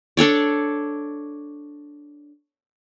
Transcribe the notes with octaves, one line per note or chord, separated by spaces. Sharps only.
D4 A4 C#5 D5